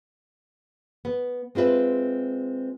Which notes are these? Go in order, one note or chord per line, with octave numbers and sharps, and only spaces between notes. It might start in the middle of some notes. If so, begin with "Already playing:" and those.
B3
G#3 C4 F4 B4 E5